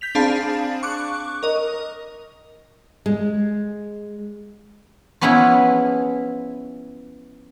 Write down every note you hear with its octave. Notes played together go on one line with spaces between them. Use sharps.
G6 B6 F7
C4 D4 G#4 F5 A5 B5
C#6 D6 F#6
A#4 D#5
G#3
F3 B3 C#4 E4 G#4 B4